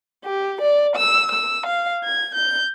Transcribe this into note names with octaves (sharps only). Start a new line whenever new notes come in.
G4
D5
E6
E6
F5
G#6
G6